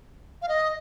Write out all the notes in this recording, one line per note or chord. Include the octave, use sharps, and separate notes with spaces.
F5
D#5